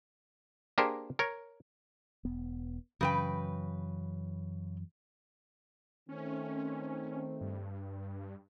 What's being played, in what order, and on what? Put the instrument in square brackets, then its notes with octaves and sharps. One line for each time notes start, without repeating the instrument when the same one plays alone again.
[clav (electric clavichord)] A#3 D4 G4 G#4 A#4 C5
A#4 C#5
[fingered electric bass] E1 B3
[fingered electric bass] F#2 E3 F#3 [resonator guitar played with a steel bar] C#3 B4 G5
[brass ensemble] D#3 A3 C4 [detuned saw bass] C#4
[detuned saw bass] G2